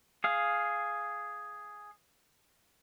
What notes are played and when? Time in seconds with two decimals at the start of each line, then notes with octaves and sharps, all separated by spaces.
0.24 G#4 F5